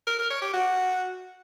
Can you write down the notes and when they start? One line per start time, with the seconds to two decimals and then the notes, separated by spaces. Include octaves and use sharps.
0.07 A#4
0.19 A#4
0.30 C#5
0.42 G4
0.54 F#4